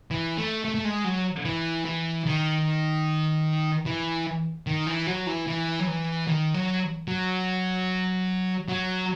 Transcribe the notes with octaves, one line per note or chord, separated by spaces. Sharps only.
E3
A3
A3
A3
G#3
F#3
E3
E3
D#3
E3
D#3
E3
F#3
E3
E3
F#3
E3
D#3
F#3
F#3
F#3